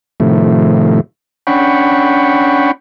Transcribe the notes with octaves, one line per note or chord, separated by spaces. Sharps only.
A2 C3 D#3 F3 A3
C#4 D4 F#5 G5 B5 C#6